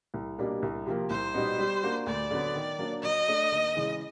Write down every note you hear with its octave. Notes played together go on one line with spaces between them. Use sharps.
C2
B2 G3 A#3 D4
C2
C3 F3 A#3
C2 C5
B2 G3 B3 D#4
G3
A#3 D4 F#4
D2 D5
D3 F#3 B3
D#3
F#3 A#3 D4
F#3 D#5
A3 D4
D#2
C#3 E3 G#3